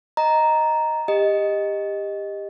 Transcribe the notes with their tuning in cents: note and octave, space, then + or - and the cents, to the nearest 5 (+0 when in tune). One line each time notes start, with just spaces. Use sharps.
D#5 +0 A#5 +0
G4 +20 D#5 +0